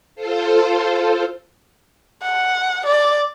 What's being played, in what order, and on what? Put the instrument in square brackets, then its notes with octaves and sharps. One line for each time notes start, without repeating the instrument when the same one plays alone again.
[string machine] F4 A4 C5
[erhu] F#5
D5